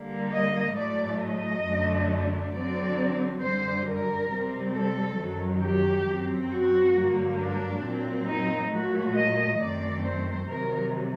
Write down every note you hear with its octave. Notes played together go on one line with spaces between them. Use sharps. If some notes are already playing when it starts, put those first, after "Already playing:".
Already playing: D3 G3 A#3
D#5
A2 F#3 A3 D5
D#5
F#2 D3 F#3 A3 D4
D3 F#3 C4 D5
F#2 D3 G3 C5
A#4
C3 G3 C4
A4
F#2 D#3 F#3
G4
F#2 F#3 C4
F#4
G2 D3 F#3 A#3
D4
A#2 F#3 C4
D#4
A#2 F#3 A3 F#4
D#5
F#2 D#3 A3 C4 D5
C5
C3 D#3 F#3 A#4